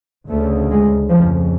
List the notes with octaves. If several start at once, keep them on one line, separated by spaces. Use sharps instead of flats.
D2 C#3 A3
G#3
F2 C#3 F3